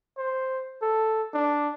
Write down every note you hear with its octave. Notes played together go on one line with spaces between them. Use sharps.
C5
A4
D4